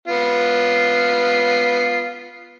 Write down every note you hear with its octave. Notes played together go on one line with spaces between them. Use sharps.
B3 F4